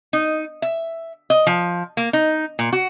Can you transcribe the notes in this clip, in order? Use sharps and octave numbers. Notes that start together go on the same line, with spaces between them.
D#4
E5
D#5
F3
A#3
D#4
A#2
F#4